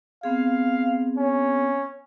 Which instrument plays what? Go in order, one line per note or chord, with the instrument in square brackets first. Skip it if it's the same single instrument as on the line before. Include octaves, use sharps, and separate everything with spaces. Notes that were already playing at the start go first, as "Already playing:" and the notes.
[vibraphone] B3 C4 G#4 [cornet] F5
[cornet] C#4